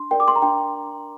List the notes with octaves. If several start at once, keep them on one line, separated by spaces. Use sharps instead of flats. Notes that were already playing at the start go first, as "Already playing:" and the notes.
Already playing: D4 C6
A#4 D5 G5
D6
C6
A#5
D4 G5